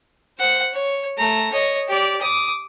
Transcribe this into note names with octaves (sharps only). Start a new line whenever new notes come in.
C5 F#5
C#5
A3 A#5
C#5 D#5
G4 D5
D6 D#6